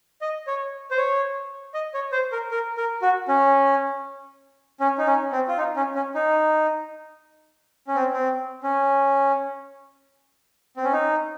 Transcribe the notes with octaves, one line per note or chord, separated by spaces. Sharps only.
D#5
C#5
C5
C#5
D#5
C#5
C5
A#4
A#4
A#4
F#4
C#4
C#4
D#4
C#4
C4
F4
D#4
C#4
C#4
D#4
C#4
C4
C4
C#4
C4
C#4
D#4